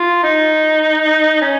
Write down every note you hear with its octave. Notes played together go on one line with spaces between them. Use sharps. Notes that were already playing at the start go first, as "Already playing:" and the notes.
Already playing: F4
D#4
C#4